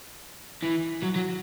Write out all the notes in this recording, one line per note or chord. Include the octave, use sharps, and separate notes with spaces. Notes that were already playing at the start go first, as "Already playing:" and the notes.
E3
F#3
F#3